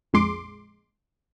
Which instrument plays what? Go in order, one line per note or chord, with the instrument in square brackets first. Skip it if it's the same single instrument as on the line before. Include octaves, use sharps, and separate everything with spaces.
[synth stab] A#1 F2 G#3 C6 D6